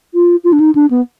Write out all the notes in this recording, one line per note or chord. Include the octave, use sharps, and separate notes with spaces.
F4
F4
D4
D#4
D4
B3